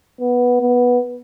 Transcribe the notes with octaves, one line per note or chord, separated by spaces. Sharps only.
B3
B3